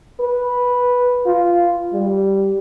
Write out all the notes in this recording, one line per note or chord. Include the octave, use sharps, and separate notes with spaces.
B4
F4
G3